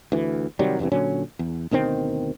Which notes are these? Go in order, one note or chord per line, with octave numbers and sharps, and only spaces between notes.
D2 E3
C3 D#3 F#3 G3
E2 G2 C3 E3
A#2 D3 F#3 C#4
E2
D2 B2 D#3 C4